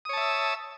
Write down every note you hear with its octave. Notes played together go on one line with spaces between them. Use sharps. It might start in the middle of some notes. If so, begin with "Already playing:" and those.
C#5 E5 A5 D#6 E6